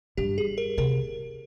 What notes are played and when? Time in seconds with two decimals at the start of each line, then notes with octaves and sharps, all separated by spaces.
0.17 G2 G4
0.38 G#4
0.58 A#4
0.78 C3 A#4